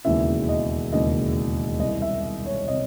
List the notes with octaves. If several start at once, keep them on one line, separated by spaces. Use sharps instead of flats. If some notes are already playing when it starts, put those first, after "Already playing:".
E1 D#2 C#3 E3 E5
D#5
E1 D#2 C#3 E3 D#5
C2 C3 E3 D#5
E5
C#5
C3 D#5